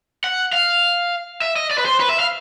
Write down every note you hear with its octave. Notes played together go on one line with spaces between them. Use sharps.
F#5
F5
E5
D#5
D5
B4
C5
B4
E5
F5